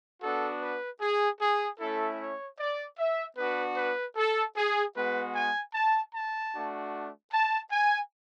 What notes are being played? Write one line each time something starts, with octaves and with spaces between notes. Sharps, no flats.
B3 D4 F#4 A4
B4
G#4
G#4
A3 C#4 E4 A4
C#5
D5
E5
B3 D4 F#4 B4
B4
A4
G#4
G#3 B3 F#4 B4
G#5
A5
A5
A3 D4 F#4
A5
G#5